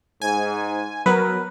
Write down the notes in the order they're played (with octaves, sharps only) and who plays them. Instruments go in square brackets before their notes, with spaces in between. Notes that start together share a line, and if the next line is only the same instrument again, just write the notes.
[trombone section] G#2 [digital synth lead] G#5
[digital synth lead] F#3 [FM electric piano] B3 B4 [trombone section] A#4